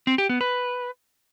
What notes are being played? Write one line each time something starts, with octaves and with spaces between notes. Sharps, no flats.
C4
G4
B3
B4